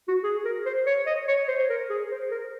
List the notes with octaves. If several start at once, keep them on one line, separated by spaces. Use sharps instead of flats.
F#4
G#4
A#4
C5
C#5
D#5
C#5
C5
A#4
G#4
C5
A#4